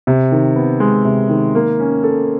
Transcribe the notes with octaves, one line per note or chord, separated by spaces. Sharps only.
C3
D#3
B3
G#3
C3
D#3
A#3
C#4
A4